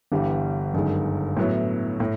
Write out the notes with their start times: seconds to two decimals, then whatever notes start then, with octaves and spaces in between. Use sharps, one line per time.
0.12 G1 G2 E3 G3
0.74 G1 F#2 D#3 G#3
1.37 A2 F#3 B3 E4
2.00 A2